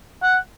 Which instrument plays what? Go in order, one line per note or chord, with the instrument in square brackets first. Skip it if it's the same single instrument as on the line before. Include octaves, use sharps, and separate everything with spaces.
[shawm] F#5